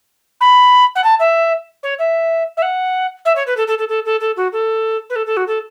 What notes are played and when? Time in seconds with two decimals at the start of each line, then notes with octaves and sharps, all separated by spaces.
0.40 B5
0.95 F#5
1.04 A5
1.19 E5
1.83 C#5
1.99 E5
2.57 E5
2.62 F#5
3.25 E5
3.35 C#5
3.46 B4
3.56 A4
3.67 A4
3.78 A4
3.88 A4
4.05 A4
4.20 A4
4.36 F#4
4.52 A4
5.09 B4
5.15 A4
5.26 A4
5.36 F#4
5.47 A4